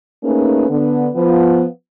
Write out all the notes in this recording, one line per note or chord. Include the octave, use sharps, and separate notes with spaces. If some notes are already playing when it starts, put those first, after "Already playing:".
A3 A#3 C#4 D#4 G#4 B4
D3 B3
F3 B3